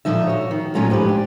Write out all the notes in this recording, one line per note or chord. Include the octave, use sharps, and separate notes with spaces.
A#2 D3 D#3 F3 D#4 E5
F#4 C#5
D#3
A#2 F#3 A3 C#4 F4 A#5
G#2 F3 G4 B4
D4